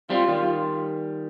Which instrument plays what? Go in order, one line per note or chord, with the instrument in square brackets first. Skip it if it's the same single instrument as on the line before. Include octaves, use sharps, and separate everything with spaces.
[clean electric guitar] G3 C4 [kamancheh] F4
[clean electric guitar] D#3 G3